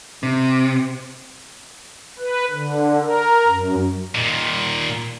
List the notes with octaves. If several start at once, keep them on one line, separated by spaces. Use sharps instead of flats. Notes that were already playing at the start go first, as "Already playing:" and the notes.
C3
B4
D3
A#4
F#2
A#2 D#3